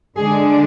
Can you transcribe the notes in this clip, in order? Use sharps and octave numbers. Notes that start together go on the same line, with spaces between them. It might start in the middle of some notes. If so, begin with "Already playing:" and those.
D3 G#3 D4 G#4